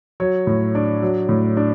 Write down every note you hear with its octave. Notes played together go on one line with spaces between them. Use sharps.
F#3 C#5
A2
D4
F#3
A2
D4